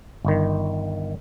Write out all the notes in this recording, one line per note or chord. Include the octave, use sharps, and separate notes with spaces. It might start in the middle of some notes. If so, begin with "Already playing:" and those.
G1 D#3